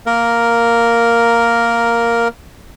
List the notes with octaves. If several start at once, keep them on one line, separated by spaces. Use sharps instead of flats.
A#3 A#4